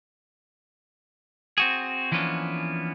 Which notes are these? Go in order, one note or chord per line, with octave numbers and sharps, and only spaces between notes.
C4 F#4 G#4
E3 F3 A#3 B3 C#4 D4